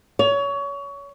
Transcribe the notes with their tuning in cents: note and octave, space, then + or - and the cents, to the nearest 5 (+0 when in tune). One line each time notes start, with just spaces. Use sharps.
C#5 +25